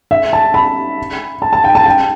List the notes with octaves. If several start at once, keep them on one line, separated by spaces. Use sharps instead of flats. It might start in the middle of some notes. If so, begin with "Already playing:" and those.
E5
A5
B5
A5
A5
G5
A5
G5